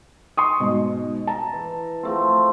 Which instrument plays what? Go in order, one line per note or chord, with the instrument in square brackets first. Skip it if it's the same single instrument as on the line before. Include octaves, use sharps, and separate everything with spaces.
[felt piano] C6 C#6 D#6
G#2 B2
A5 A#5
[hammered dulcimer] E3
F3 A3 C4